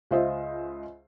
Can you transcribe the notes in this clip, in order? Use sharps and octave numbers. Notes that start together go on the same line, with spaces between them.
C#2 F4 C5 D#5 E5